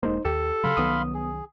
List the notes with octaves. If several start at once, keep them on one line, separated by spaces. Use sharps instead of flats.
E1 G#3 A#3 D#4 C5
D#2 G4 A4
C#3 F#3 F5 B5 C6
C2 D#3 F#3 B3 D#6
G#4